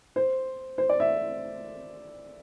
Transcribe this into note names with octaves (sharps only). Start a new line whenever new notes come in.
C5
C5
D5
E5